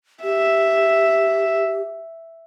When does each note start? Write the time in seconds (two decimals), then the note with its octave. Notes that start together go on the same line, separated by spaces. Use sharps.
0.23 G4 E5